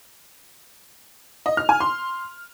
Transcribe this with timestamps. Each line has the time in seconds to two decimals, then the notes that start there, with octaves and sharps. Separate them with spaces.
1.46 D#5
1.57 F6
1.69 G#5
1.80 C6